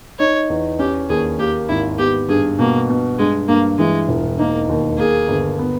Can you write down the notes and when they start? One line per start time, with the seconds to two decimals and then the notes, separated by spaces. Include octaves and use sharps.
0.19 D#4 C#5
0.50 E2
0.79 C#4 G4
1.09 D#2 G#4
1.39 A#3 G4
1.69 G#1 E4
1.99 B3 G4
2.29 G2 G#4
2.58 B2 A#3
2.90 B2
3.19 G2 G#3
3.48 G2 A#3
3.79 E3 G#3
4.09 E1
4.39 A#3 D#4
4.69 D#2
4.98 A#3 G#4
5.28 G1
5.59 B3